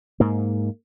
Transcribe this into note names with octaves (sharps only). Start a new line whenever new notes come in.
G#2 A#3